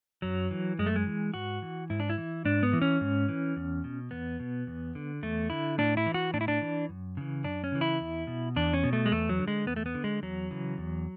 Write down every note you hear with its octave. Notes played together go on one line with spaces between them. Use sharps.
F#2 F#3
E3
F#2 G#3
A3
G#3
E3
G#2 F#4
E3
G#2 E4
D4
E4
E3
G#2 D4
B3
E3
C#4
G#2
E3
E2
B2
E2 B3
B2
E2
D3
E2 A3
D3 E4
A2 D4
E4
E3
F#4
A2 D4
E4
D4
E3
F#2
C#3 E3
F#2 D4
C#4
C#3 E3
E4
E2
B2
E2 D4
C#4
B2
A3
G#3
E2 A3
F#3
D3
G#3
E2 B3
A3
B3
D3
G#3
E2 F#3
C#3 E3
E2